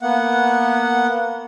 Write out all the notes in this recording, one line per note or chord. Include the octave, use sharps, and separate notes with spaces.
A#3 B3 F#5